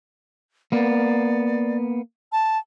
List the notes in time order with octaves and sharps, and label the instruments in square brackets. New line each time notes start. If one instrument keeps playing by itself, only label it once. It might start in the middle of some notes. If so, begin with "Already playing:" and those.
[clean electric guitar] A#3 B3 [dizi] D5
[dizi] A5